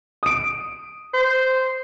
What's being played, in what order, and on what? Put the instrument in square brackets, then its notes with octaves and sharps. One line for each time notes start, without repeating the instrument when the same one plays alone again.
[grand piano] D#6 D7
[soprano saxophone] C5